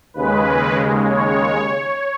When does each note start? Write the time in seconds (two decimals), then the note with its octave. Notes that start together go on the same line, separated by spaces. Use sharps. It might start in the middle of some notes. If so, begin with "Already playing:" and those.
0.14 D#2 C#3 G#3 B4
1.03 C#5